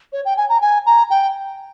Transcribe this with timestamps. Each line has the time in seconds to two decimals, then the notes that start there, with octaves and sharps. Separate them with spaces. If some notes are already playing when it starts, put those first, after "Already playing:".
0.12 C#5
0.25 G5
0.37 G#5
0.49 A#5
0.61 G#5
0.86 A#5
1.10 G5